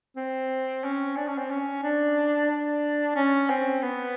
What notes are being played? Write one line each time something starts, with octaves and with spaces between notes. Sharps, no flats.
C4
C#4
D4
C#4
C4
C#4
D4
D4
C#4
C4
B3